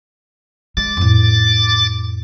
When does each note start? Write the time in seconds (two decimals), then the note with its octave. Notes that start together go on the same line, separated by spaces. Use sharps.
0.77 G#3 D6 A6
0.97 F2 A2